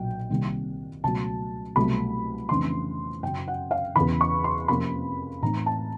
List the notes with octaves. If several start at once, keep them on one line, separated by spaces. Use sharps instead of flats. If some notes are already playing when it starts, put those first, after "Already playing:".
Already playing: B1 A#2 F#3 G5
C2 C3 D#3 G3 A#3
C#2 B2 F#3 A3 A5
C2 B2 F#3 A3 B5
F2 C#3 E3 A3 D4 C6
F#2 C#3 F#3 G5
F#5
F5
E2 C#3 E3 B5
C#6
C6
F2 C3 F3 A#3 C#4 B5
A2 E3 A3 C4 D#4 A#5
A5